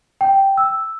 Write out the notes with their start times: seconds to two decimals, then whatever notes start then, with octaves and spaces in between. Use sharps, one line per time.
0.21 G5
0.57 E6